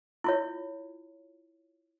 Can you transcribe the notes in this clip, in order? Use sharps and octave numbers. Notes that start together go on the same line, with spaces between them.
E4 F4 C#5